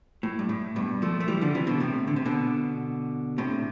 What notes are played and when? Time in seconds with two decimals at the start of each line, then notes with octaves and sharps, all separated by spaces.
0.23 A2
0.39 G2
0.49 A2
0.76 G2 B2
1.02 F3 A3
1.20 A3
1.28 E3 G3
1.41 D3 F3
1.55 C3 E3
1.67 B2 D3
1.80 A2 C3
2.07 D3
2.16 C3
2.25 B2 D3
3.38 A2 C3